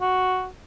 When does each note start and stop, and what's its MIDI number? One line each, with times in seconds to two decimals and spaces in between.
0.01 0.48 66